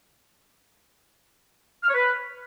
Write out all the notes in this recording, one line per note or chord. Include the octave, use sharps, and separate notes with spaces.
F6
C#5
B4